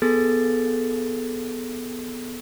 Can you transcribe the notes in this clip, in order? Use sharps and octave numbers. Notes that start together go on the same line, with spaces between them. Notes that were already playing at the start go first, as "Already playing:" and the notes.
B3 G#4 A4 A6